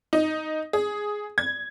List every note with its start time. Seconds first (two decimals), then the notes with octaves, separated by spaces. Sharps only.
0.13 D#4
0.73 G#4
1.38 G#6